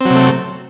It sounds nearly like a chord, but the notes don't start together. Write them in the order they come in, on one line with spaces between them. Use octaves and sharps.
C4 F#3 C3 A3